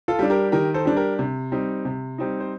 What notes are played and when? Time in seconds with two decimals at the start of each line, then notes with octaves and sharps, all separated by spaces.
0.08 F4 A4
0.19 G3 D4
0.30 G4 A#4
0.52 D#3 G4 A#4
0.74 A4 C5
0.85 G3 D4
0.96 G4 A#4
1.19 C3
1.52 G3 C4 D#4
1.85 C3
2.18 G3 C4 D#4
2.40 C5